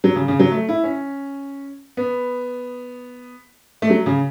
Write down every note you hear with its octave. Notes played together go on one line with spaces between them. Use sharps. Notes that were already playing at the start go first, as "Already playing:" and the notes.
F#3
C#3
C#3
F#3
A3
E4
C#4
B3
A3
F#3
C#3